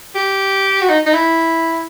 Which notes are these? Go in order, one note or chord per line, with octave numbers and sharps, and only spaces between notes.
G4
F#4
D#4
D#4
E4